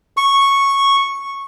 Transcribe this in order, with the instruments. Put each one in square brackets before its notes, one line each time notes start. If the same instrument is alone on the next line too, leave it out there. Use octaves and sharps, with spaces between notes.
[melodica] C#6